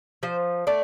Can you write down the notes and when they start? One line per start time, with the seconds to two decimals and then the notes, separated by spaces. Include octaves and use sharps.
0.23 F3 C5
0.67 A3 D5